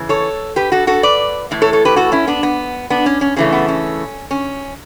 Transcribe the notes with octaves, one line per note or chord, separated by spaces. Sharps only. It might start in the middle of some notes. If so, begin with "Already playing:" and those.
Already playing: C#3 E3
A4 C#5
G4 B4
F#4 A4
F#4 A4
B4 D5
A2 E3
A4 C#5
A4 C#5
G4 B4
F#4 A4
C#4 E4
B3 D4
B3
B3 D4
C#4
C#4
C#3 E3 A3 C#4
B3
C#4
C#4